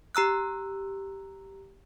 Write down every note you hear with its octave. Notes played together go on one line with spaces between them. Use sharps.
G4 A#5 E6 F#6